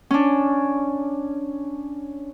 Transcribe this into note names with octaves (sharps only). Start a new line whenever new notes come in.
C#4 D4